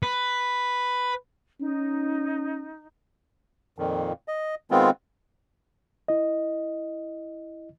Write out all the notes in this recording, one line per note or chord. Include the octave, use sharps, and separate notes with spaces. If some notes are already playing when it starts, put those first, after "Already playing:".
B4
C#4 D#4
F2 A#2 D#3
D#5
D#3 G#3 B3 C4 F4
E4 D#5